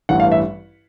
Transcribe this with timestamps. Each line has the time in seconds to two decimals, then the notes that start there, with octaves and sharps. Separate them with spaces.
0.09 A1 G2 E3 F#5
0.20 F5
0.32 E5